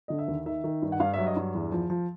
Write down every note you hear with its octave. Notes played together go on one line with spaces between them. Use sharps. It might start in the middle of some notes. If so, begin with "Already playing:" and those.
D3 D#5
E5
D#2
D#3 E5
D#3
G2
F#5
G2 F5
E5
F#3
D#5
G2
E2
F3
F3